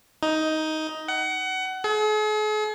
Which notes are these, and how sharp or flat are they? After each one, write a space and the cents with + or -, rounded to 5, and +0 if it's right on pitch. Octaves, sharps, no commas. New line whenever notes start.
D#4 +10
F#5 +25
G#4 +45